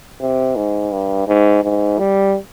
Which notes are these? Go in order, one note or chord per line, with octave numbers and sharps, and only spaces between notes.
C3
G#2
G2
G#2
G#2
G3